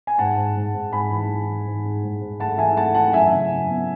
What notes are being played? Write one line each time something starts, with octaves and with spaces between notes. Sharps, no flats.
G#5
G#2 F#5 A5
G#2
G#2
G#2
G#2 G#5 B5
E3
E3
E3
G#2
G#2
G#2
G#2
A3 F#5 A5
E3 E5 G#5
A3 F#5 A5
E3 F#5 A5
F#2 E5 G#5
C#3
F#2
B3